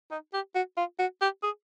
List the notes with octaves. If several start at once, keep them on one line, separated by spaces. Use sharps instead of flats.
D#4
G4
F#4
F4
F#4
G4
G#4